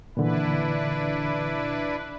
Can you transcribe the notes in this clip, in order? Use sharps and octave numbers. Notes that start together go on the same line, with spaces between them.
A#2 D3 E3 D4 E4 B4